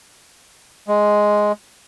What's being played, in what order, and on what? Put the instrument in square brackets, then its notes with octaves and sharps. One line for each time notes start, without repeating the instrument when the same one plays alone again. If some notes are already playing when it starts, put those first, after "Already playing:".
[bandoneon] G#3